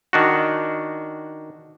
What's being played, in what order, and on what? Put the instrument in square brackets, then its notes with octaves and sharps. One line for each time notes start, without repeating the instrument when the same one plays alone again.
[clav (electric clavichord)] D#3 D4 F#4